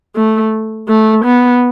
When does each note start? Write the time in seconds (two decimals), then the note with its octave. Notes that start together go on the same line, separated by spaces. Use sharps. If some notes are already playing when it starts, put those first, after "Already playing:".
0.16 A3
0.88 A3
1.25 B3